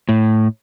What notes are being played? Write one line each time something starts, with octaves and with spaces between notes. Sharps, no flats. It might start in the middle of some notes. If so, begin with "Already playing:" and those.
A2